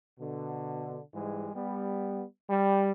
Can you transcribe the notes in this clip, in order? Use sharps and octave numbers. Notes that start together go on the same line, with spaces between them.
B2 D3
G#2 E3 G3 G#3
G3 B3
G3